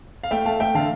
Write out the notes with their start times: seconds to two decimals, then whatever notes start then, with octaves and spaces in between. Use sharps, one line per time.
0.23 F5
0.31 A3 E5 G5
0.45 A3 F5 A5
0.60 A3 E5 G5
0.75 D3 F5 A5